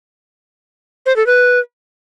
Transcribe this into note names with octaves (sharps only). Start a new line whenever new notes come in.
C5
A4
B4